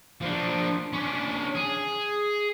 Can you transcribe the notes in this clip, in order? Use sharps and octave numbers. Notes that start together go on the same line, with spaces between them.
F3 D4
C#4 D4
G#4